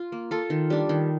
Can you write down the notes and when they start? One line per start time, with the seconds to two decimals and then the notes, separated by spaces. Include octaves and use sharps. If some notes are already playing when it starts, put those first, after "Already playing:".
Already playing: F4
0.12 A#3
0.31 F4 A4
0.50 D#3
0.70 G3 D4
0.89 D#3